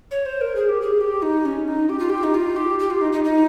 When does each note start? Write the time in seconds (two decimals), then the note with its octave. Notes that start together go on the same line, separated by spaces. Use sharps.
0.11 C#5
0.26 C5
0.41 A#4
0.56 G#4
0.69 G4
0.81 G#4
1.01 G4
1.22 D#4
1.45 C#4
1.68 D#4
1.89 G4
1.99 F4
2.10 G4
2.23 D#4
2.34 F4
2.56 G4
2.79 G4
2.90 F4
3.01 D#4
3.12 D#4
3.24 D#4